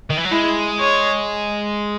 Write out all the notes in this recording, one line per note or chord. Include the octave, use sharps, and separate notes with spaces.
D#3
E3
F#3
G#3 E4
C#5